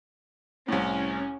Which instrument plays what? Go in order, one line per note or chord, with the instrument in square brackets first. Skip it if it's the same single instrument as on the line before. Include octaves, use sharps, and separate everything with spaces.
[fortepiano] C2 A2 [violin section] C#4